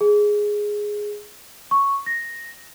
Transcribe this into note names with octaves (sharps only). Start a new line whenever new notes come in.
G#4
C#6
A#6